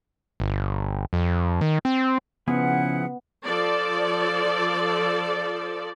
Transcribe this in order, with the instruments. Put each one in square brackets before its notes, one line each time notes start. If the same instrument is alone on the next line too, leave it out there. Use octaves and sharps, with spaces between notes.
[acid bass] G1
F2
D#3
C4
[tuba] C#3 [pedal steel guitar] F3 E4 G#4 [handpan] B3 [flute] F#5
[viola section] F3 A4 D5